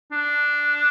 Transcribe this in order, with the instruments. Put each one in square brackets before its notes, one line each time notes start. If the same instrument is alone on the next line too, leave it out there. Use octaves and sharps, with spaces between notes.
[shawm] D4